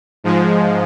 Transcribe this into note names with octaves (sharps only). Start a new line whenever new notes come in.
G#2 F3 G#3